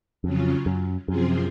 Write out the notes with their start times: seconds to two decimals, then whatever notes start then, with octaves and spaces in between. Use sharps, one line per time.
0.24 F2 C#3 F#3 C#4 F4
0.66 F#2
1.08 F#2 C3 F3 C4 F4 G#4